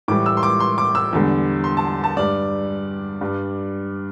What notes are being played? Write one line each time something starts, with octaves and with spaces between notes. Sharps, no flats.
A2 E3 G3 D6
E6
C6
D6
C6
D6
E6
E2 D3 G3
C6
A5
A5
G2 G3 D5
G2 G3